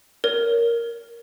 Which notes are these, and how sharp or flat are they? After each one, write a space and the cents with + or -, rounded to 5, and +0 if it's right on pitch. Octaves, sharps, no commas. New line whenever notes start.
A#4 +0 C#5 +30